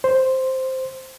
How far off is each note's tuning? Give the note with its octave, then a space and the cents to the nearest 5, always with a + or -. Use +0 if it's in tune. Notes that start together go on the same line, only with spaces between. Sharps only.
C5 +0